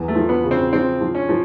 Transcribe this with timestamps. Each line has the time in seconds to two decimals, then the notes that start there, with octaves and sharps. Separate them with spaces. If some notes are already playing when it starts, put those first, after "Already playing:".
Already playing: E2
0.08 A3
0.15 F3
0.29 B3
0.44 C#3
0.51 C4
0.72 F3 C4
1.01 F3
1.15 C#4
1.29 F3